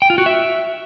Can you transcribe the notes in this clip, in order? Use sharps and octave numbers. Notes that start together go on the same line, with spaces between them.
G5
F4
F#4
E5